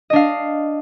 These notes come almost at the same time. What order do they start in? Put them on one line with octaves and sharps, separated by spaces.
D#5 D4 F5